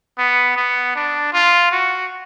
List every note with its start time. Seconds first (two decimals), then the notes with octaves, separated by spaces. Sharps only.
0.18 B3
0.57 B3
0.96 D4
1.33 F4
1.72 F#4